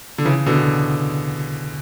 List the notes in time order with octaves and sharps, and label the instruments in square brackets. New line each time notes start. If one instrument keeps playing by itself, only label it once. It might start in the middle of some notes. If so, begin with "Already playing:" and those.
[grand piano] D3
C#3 E3
B2 D3